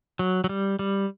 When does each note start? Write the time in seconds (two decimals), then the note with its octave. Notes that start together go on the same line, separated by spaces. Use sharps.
0.19 F#3
0.44 F#3
0.49 G3
0.79 G3